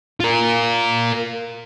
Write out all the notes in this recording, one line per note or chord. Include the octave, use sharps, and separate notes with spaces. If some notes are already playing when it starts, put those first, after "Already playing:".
F4 A#4